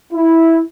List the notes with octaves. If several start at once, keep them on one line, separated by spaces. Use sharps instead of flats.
E4